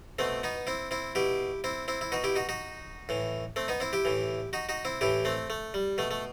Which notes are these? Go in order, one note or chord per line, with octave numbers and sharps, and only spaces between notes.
B2 A3 C4
B3 D#4
C4 E4
C4 E4
B2 E4 G4
C4 E4
C4 E4
E4
B2 D#4 F#4
E4 G4
D#4 F#4
D#4 F#4
A2 E3
A3 C4
B3 D#4
C4 E4
E4 G4
A2 E3
D#4 F#4
D#4 F#4
C4 E4
A2 E3 E4 G4
A3 C4
A3
G3
B2 A3
A3